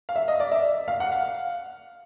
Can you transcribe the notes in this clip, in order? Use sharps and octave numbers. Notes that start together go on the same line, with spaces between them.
F5
E5
D#5
D5
E5
F5
F#5
F5